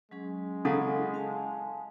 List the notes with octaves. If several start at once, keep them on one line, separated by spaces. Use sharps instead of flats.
F#3 G#3 C#4 G#4
C#3 E4 A4 F#5
F5 G#5 A5